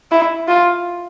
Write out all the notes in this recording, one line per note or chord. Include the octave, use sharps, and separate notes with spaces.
E4
F4